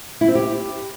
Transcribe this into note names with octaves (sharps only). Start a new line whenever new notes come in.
E4
C4
G4